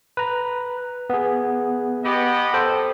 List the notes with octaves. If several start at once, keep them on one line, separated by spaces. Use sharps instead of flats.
B4 A#5
B3 G#4
B3 G4 D#5
A4 C5 G5